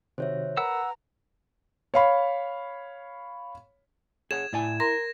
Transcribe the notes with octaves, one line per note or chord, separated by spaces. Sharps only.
C3 D#3 F#4 C5 C#5 E5
A#4 B4 F#5 A#5 B5 E6
C#5 F5 B5
G#4 C#5 F#5 G#6 E7
A2 E4 D5 G#5
A#4 A#5 C6 A#6